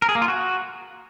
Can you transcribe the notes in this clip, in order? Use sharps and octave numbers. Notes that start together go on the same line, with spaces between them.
A#4
G#4
A#3
F4
F#4